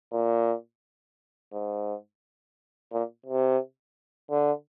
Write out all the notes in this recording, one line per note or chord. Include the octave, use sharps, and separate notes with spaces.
A#2
G#2
A#2
C3
D3